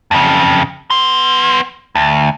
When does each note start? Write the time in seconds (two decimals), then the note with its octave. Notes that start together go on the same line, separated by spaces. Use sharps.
0.11 F2 C#3
0.90 B3 C6
1.95 D2